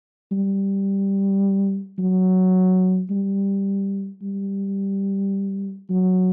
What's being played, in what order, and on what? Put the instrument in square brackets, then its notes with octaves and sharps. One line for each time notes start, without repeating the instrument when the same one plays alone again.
[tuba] G3
F#3
G3
G3
F#3